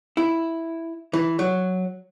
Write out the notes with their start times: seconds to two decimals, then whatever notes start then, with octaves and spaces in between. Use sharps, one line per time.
0.17 E4
1.13 E3
1.39 F#3